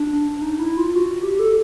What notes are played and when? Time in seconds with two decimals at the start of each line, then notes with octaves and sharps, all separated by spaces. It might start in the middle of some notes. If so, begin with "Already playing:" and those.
Already playing: D4
0.37 D4
0.42 D#4
0.59 E4
0.77 F4
0.95 F#4
1.22 G4
1.39 A4